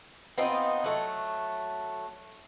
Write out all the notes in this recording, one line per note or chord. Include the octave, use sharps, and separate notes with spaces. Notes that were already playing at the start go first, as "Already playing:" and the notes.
B3 C4 D#4 F4
F#3 A3